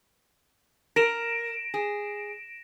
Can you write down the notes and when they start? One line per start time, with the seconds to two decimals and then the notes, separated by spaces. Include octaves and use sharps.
0.96 A#4 A#6 D7 E7
1.74 G#4